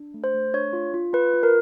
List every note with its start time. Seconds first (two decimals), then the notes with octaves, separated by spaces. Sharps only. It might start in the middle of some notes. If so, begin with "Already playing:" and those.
Already playing: D4
0.14 A3
0.24 C5
0.34 A3
0.54 D4 C#5
0.73 F4
0.94 F4
1.13 F4 B4
1.34 F4
1.43 A#4